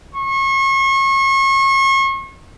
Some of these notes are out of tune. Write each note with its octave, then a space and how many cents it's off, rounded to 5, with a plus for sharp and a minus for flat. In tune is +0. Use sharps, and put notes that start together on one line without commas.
C#6 -35